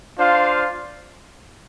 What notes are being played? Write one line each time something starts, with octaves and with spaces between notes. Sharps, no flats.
D4 F4 C5 F5